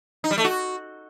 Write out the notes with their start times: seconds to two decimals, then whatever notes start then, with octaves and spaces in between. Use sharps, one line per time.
0.24 D#4
0.31 G3
0.38 A3
0.44 F#4